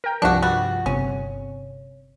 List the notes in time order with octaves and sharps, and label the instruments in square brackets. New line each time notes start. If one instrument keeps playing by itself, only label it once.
[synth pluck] A#4 G5
[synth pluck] C2 G2 F3 [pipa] D4 F#4
[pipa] G3 F#4
[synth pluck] G1 C3 [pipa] C#4